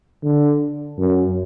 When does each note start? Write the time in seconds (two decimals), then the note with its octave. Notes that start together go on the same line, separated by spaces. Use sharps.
0.24 D3
0.98 F#2